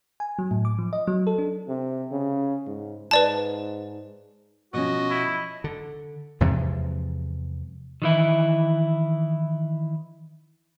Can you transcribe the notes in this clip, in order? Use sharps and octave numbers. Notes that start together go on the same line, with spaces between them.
G#5
F#3
A2
D6
F3
D#5
F#3
A4
D4
C3
C#3
G#2
G#2 B4 D5 A5
B2 F3 C#4 F#4 D#5
E4
D3
E2 C3 F3 G#3
D#3 E3 E4